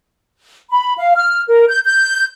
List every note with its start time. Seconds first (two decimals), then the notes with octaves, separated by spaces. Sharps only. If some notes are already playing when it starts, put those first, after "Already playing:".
0.71 B5
0.98 F5
1.16 F6
1.48 A#4
1.68 G6
1.84 G6